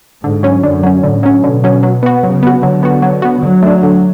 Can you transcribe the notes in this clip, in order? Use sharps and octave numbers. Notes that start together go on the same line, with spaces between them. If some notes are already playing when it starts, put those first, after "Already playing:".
G#2 D3
F#3 C#4
F#2 D3
F#3 C#4
A2 D3
F#3 C#4
B2 D3
F#3 C#4
F#3
B3 F#4
C#3 F#3
B3 F#4
D3 F#3
B3 F#4
F#3
B3 F#4
D3 F#3
A3 D4
D3